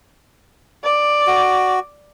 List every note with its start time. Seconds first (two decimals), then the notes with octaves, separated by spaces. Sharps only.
0.84 D5
1.27 F#4